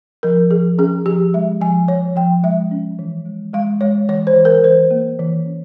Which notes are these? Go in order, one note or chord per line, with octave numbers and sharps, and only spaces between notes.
F3 A#4
F3 G#4
C#4 G#4
F3 G4
G#3 E5
F3 G#5
F3 C#5
F3 G5
G#3 E5
C#4
E3
G#3
G#3 F5
G#3 C#5
E3 C#5
C5
E3
A#4
E3 C5
A#3
E3
C#4